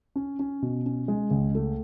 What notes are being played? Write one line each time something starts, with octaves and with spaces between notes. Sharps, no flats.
C#4
C#4
B2
C#4
G#3
C#2
A3